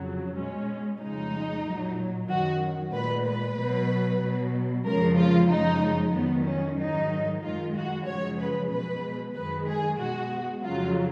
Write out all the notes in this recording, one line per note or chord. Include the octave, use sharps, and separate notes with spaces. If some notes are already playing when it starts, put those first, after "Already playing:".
Already playing: F2 C#3 F#3
B2 G#3 C#4
F2 C#3 G#3 D#4
A#2 F#3
F#2 D#3 F#3 F#4
A#2 G#3 B4
B4
B2 F#3
B2 F#3
F2 C#3 F3 G#3 A#4
F4
F#2 C#3 F3 G#3 D#4
F2 D#3 F#3 B3
C#4
G#2 D#3 F#3 D#4
F#2 D#3 G#3 F4
F#4
F#2 C#3 F3 G#3 C#5
B4
B2 G#3 B4
F#2 D#3 G#3 B4
G#4
B2 G#3 F#4
F2 C#3 F#3 F4